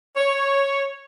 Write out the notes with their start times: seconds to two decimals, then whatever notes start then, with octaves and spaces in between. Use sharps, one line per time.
0.16 C#5